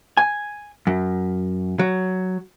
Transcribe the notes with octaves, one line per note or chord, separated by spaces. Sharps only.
G#5
F#2
F#3